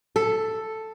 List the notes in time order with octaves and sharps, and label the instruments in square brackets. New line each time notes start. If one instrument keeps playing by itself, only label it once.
[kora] A4